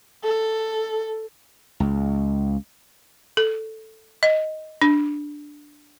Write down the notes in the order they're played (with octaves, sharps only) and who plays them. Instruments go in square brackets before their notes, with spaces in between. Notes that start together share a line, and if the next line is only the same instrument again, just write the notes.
[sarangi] A4
[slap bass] C#2
[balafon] A4
D#5
D4